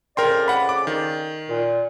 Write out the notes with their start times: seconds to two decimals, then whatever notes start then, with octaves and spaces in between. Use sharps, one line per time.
0.17 F2 C#3 A#4 D5 G5 C6
0.48 F#5 B5
0.69 D6
0.87 D#3
1.49 A#2